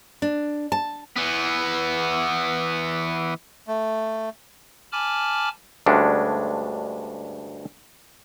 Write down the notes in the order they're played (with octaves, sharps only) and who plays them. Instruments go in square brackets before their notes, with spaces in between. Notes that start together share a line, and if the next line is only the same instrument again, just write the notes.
[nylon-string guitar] D4
A5
[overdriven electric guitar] E3 B3
[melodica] A3
[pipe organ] G#5 A5 B5 D6 F6
[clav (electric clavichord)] D2 G2 G#3 C#4 D4